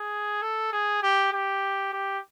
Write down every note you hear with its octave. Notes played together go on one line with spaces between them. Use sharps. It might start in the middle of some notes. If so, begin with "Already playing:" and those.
Already playing: G#4
A4
G#4
G4
G4
G4